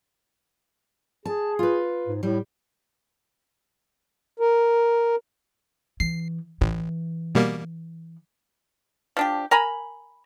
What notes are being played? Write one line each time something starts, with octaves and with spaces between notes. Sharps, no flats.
G#4 A5
F4 B4
G#2
A2 G3
A#4
E3 C7
A1 E3
B2 G3 A#3
F3 D4 G4
A#4 G#5 A#5 B5